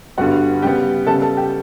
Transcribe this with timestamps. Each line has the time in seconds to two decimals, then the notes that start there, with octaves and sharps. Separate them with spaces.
0.18 G2 D3 G3 B3 F#4 F#5
0.62 C#3 G3 B3 G4 G5
1.07 C#3 G3 B3 A4 A5
1.22 A4 A5
1.37 G4 G5